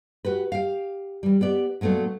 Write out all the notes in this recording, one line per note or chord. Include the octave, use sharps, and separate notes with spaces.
F#4 G4 B4
G4 F5
E3 G3
B3 G4 D5
A#2 F#3 A3 B3 D4